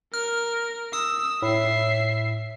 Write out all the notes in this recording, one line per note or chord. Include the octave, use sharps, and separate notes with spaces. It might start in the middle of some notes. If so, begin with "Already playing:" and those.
A#4 F6
D#6 E6
A2 E5 C7